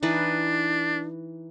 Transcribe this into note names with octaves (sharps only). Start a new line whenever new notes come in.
E3 D4 D#4 B4